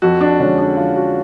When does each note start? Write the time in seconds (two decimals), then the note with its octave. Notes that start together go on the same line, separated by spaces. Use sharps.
0.02 F2 F#4
0.21 D4
0.40 D3 G#3 C#4
0.58 D4
0.77 F2 F4
0.96 F#4